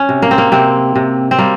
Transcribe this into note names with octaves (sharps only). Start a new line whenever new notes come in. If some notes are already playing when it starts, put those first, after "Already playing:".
Already playing: C#4
C3
A#3
C4
A#3
C3 C4
C3
C4
G3 A#3